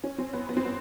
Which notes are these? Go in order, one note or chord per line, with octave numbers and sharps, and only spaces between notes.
C#4
C4
B3
B3
C4
B3